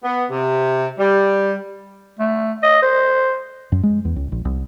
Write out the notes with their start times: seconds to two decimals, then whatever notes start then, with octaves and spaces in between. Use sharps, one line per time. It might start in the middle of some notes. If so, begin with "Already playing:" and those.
0.03 B3
0.30 C3
0.99 G3
2.20 A3
2.63 D#5
2.83 C5
3.72 F#2
3.83 G#3
4.05 E2
4.16 C#2
4.32 A#1
4.45 C2